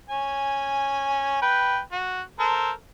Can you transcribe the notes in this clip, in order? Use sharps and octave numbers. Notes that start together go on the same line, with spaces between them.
C#4 G#5
B4 G5
F#4
A4 A#4 C5